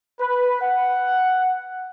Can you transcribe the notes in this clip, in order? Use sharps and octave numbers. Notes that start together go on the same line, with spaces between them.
B4
F#5